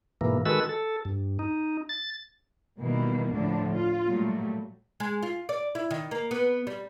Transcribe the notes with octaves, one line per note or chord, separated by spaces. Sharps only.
G#2 B2 E3 A#3
D#3 G#3 F#4 A4 B4 E6
A4
G2
D#4
A6
B2 D#3 E3 G3 A#3 E4
D2 A2 D3 F3 D4
F4
A#2 F#3 G3 A3
G#3
F4
D5
E4
D#3
A#3
B3
G3